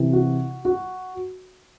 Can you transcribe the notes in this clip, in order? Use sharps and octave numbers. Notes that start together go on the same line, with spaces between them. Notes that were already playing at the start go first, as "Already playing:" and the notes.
Already playing: C3 E3
F#4
F#4